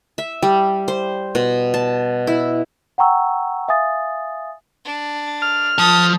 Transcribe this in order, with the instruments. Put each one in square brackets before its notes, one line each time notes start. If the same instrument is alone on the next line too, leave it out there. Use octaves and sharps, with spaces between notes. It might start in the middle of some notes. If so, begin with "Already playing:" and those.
[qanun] E5
G3
C5
B2
A5
E4
[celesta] F#5 G5 A#5 C#6 E6
E5 F5 G#5 D#6 A6
[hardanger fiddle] D4
[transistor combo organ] F6
[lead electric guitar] F3 A5 [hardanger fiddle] A4 D#6